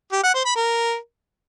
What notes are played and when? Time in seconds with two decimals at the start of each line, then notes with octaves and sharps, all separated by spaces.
0.12 G4
0.23 F#5
0.34 C5
0.45 B5
0.56 A#4